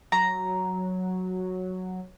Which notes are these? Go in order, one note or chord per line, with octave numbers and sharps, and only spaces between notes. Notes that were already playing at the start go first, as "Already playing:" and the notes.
F#3 A#5